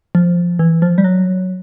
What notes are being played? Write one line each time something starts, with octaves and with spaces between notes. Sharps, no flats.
F3
E3
F3
G3
F#3